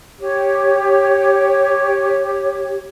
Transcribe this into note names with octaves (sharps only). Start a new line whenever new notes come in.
G4 C#5